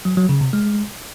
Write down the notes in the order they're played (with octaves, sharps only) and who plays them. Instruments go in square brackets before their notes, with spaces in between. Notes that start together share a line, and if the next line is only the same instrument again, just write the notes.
[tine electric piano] F#3
F#3
C#3
C3
G#3